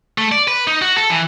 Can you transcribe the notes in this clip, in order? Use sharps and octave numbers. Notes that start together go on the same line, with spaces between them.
A3
D5
B4
D#4
F#4
A4
E3